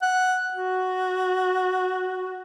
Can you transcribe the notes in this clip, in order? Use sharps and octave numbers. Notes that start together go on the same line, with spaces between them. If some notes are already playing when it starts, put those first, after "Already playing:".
F#5
F#4